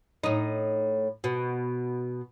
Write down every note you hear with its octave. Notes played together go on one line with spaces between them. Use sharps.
A2 D#4
B2